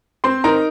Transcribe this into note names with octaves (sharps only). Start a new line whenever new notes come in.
C4 C5 C6
D#4 A#4 A#5